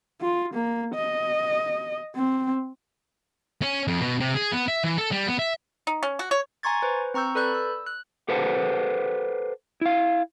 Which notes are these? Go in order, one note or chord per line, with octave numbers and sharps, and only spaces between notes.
F4
A#3
D#5
C4
C#4
F2
B2
C3
G#4
B3
E5
E3
A4
G3
B3
E5
D#4
C#4
F#4
C#5
G#5 A#5 C6 C#6 G#6 A6
B4 C5
C4 A#5 C#6 E6 G6
A4 B4 D5 B5 F#6 G6
E6
F#6
G4 A4 B4 C5 F#5 A5
E4 F5